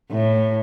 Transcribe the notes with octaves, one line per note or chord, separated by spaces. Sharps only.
A2